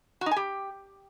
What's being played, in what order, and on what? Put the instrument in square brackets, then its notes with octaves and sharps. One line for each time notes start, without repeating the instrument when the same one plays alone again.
[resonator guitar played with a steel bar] F#4
D#4
G#5
G4